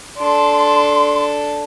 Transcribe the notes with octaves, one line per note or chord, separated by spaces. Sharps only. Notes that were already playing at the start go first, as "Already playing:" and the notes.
D4 A4 C6